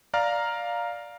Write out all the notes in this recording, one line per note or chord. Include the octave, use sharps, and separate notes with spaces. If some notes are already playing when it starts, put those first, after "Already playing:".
D5 F5 A#5 F6